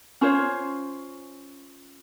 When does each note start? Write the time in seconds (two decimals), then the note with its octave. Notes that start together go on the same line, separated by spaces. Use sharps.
0.21 C#4 F4 C5 C#5